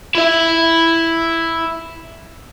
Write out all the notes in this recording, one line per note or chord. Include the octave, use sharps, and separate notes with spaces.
E4 E5